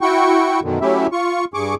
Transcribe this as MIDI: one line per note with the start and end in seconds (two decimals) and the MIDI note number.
0.01 0.60 64
0.01 0.60 66
0.01 0.60 79
0.01 0.60 85
0.63 0.79 42
0.63 0.79 47
0.63 0.79 50
0.63 0.79 51
0.81 1.07 54
0.81 1.07 57
0.81 1.07 61
0.81 1.07 64
0.81 1.07 67
0.81 1.07 76
1.12 1.45 65
1.12 1.45 85
1.54 1.75 43
1.54 1.75 68
1.54 1.75 85
1.54 1.75 86